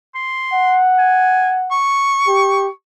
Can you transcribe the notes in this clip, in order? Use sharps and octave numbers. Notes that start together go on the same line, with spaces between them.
C6
F#5
G#5
C#6
G4